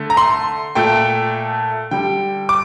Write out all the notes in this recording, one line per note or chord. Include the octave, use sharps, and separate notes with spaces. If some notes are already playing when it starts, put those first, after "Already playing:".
Already playing: D3 A3
A#5
C6
A#2 A3 G5
D3 G3 G5
D6